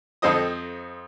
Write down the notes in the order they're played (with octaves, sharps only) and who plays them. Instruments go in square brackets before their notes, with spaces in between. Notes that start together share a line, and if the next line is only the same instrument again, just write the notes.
[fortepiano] F2 C4 A4 C5 D#5 D#6